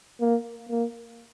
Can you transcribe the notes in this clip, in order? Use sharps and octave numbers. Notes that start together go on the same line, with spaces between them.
A#3
A#3